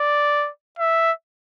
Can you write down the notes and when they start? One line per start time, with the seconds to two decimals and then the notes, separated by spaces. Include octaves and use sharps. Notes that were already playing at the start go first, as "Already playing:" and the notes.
Already playing: D5
0.79 E5